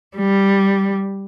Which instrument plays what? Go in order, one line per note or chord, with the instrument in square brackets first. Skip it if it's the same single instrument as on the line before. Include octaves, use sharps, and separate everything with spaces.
[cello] G3